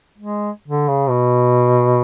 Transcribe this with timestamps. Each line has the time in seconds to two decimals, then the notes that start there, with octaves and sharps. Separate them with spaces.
0.18 G#3
0.68 D3
0.89 C#3
1.09 B2